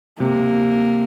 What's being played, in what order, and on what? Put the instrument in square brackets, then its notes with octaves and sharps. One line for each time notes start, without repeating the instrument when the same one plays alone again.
[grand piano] C3 [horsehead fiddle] A#3